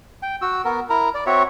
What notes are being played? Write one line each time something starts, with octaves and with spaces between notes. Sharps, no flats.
G5
F#4 E6
B3 A#4
E4 A#4 A#5
D5
C4 F#4 C#5 E5